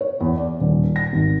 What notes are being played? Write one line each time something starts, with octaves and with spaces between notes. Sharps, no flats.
C#5
E2
D5
D#1
A#6
G#1